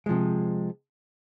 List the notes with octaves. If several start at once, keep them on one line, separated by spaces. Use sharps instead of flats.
C3 F3 G#3